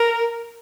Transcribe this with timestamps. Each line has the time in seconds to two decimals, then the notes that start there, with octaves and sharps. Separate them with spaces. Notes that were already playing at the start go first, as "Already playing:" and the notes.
Already playing: A#4